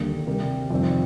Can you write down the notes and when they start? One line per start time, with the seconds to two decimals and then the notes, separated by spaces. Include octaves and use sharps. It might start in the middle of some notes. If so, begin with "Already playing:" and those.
Already playing: D#2 D3 G3 A#3
0.27 C3 G3 C4 G4 A#4
0.70 F2 C3 D#3 G3 C4